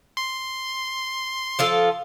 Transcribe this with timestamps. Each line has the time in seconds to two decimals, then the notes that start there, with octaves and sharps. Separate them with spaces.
0.17 C6
1.59 F3 F4 A4